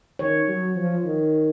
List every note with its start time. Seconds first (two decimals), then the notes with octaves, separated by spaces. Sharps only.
0.19 D#3 C#5
0.48 F#3
0.76 F3
1.05 D#3